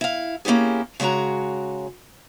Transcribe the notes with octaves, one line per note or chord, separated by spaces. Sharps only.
E4 F5
A#3 C#4 E4 G4 G#4
C#3 G#3 F#4 C#5 A#5